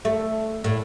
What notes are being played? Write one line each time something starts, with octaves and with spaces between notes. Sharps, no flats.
A3
A2